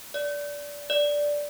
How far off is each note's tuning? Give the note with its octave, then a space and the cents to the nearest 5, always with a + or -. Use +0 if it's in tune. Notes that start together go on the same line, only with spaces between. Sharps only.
D5 -20
D5 -5